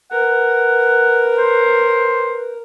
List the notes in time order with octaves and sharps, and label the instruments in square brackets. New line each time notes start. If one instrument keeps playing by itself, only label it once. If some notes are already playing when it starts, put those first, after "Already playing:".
[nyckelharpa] A#4 [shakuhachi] B4 [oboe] F#5
[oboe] C5